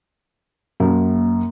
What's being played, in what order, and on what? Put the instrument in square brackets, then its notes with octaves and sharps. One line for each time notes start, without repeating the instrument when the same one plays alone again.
[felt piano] F#2 [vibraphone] A#3